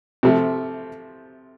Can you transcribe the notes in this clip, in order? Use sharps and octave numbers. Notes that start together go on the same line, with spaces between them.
C3 F3 A3